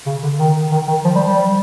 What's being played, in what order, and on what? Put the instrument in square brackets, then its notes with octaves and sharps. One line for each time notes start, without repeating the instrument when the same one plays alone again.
[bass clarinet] C#3
D3
D#3
D#3
D#3
F3
G3
G3